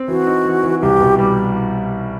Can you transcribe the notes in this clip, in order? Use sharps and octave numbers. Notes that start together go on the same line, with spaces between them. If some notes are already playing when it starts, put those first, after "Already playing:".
Already playing: C4
E3 F#4
D#4
E3
E3
C2 G4
B2
G3 G4